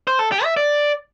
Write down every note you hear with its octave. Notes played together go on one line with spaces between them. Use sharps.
C5
A4
G4
E5
D5